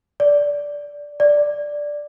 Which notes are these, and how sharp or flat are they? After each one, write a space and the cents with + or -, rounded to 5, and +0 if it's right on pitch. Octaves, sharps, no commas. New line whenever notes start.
D5 -15
D5 +0